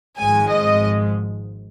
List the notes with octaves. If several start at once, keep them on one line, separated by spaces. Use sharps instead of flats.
G#1 G#2 F3 G#3 G#5
D#5